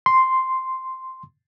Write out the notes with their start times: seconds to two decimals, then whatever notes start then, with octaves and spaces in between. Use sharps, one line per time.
0.06 C6